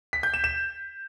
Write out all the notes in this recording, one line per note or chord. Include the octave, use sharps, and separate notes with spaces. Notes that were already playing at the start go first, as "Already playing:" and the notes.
B6
G6
E7
E7